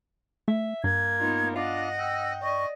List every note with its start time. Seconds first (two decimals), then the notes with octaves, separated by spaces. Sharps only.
0.48 A3 E5
0.84 G2 A#3 G#6
1.19 B3 D#4 F4
1.56 D4 F4 D#5 F#5
1.98 G5 E6
2.43 D5 D#5 C#6